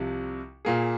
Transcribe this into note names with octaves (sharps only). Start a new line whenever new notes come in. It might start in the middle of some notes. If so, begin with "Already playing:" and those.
Already playing: C2 C3 F3
A#2 A#3 G#4